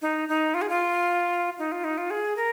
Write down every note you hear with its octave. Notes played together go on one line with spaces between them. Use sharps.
D#4
D#4
F4
G#4
F4
D#4
F4
D#4
F4
G#4
A#4